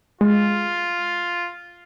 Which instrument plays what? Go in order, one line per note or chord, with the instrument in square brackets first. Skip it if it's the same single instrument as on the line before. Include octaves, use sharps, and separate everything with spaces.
[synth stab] G#3 [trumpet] F4